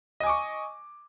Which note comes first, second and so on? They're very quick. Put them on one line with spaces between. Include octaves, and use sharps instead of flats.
D#5 G#5 D6 C#6